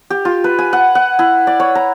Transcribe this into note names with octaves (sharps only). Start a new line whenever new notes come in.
G4
F4
B4
G#5
F#5
F#5
E4
D5
C#5
A#5